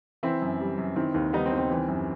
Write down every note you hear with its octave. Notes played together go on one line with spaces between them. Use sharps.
E3 C4 E4
F#2
G3
F#2
D#3 C4 E4
D#2
G3 B3 D#4
C4
D#2
C4
E3
F#2